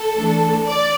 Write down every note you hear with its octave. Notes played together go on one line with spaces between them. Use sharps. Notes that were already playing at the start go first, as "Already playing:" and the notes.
Already playing: A4
E3 A3 D4
D5